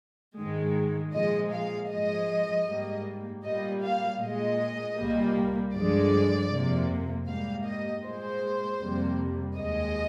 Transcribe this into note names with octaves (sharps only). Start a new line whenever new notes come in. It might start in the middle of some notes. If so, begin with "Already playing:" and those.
G#2 D#3 G#3
A#2 F3 G#3 D#5
F5
G#2 F3 G#3 D#5
G#2 G3 A#3
A#2 G3 A#3 D#5
F5
A#2 G#3 D#5
C2 A#2 G3 A#3
G2 D3 F3 G#3 D5
F2 C3 F3 A#3
G#2 G3 A#3 F5
D#5
A#2 G#3 C5
F2 C3 G3 A#3
D#2 D#3 G#3 D#5